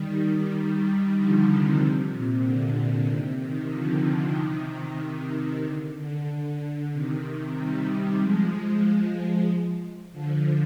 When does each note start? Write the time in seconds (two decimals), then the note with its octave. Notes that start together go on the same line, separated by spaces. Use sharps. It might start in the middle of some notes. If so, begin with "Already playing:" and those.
Already playing: D#3 G3
0.53 D#3 G3
1.17 D3 F3
1.49 C3 D#3
1.81 C3
2.13 A#2
2.44 D3
3.08 C3 D#3
3.40 C3 D#3
3.72 D3 F3
4.36 C3 D#3
5.00 C3 D#3
5.64 D3
5.96 D3
6.28 D3
6.92 C3 D#3
7.56 D#3 G3
8.20 F3 G#3
10.12 D3 F3